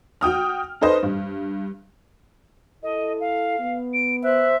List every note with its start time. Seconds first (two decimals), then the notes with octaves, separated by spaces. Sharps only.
0.21 F#4 G5 D#6 F6
0.81 D#4 A4 B4 C5 D#5
1.03 G2
2.83 E4 A4 D#5
3.20 F5
3.59 B3
3.94 D7
4.24 C5 E5 F#6